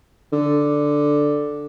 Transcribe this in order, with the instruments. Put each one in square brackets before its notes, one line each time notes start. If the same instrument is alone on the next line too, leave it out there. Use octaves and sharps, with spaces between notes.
[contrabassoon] D3